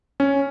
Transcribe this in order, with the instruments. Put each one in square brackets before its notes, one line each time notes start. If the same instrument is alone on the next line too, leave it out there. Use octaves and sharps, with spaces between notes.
[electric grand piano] C#4